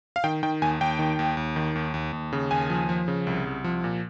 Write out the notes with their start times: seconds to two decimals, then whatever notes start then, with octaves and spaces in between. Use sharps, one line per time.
0.16 F5
0.24 D#3 G5
0.43 D#3 G5
0.62 D#2 G#5
0.81 D#2 G5
0.99 D#3
1.19 D#2
1.37 D#2
1.56 D#3
1.76 D#2
1.94 D#2
2.13 D#2
2.33 C#3
2.51 D#2 G#5
2.70 F3
2.89 F3
3.08 C#3
3.27 C2
3.45 C2
3.64 F3
3.84 A#2